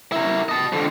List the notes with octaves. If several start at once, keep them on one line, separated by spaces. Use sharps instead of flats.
E4 A#4
D#5 A5
F2 D3